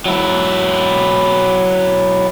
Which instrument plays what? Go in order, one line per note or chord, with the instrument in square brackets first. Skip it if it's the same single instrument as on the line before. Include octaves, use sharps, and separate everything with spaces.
[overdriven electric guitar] F#3 E4